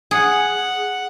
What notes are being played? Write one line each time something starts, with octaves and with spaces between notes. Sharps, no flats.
G#4 F#5